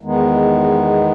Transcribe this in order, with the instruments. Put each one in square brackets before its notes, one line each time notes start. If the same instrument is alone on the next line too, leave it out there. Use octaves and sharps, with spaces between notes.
[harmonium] E2 D#3 G#3 B3 D#4